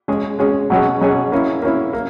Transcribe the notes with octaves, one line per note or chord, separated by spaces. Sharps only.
G#3 C#4 G#4
G#3 C#4 G#4
B2 F#3 C#4 G#4
B2 F#3 C#4 G#4
A#3 C#4 E4
A#3 C#4 E4
A#3